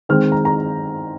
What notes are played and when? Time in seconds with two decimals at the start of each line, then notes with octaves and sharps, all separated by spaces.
0.09 D#3 G#3 C4 F6
0.32 A#5
0.45 A#5